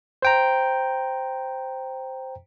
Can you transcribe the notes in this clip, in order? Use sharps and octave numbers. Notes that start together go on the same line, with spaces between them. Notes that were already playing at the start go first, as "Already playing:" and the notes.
C5 G5 A#5